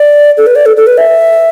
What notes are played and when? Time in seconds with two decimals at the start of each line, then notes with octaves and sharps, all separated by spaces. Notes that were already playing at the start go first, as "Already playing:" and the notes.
Already playing: D5
0.37 A4
0.47 B4
0.56 D5
0.66 A4
0.77 A4
0.87 B4
0.98 E5